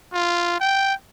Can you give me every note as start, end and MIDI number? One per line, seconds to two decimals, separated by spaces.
0.13 0.60 65
0.60 0.93 79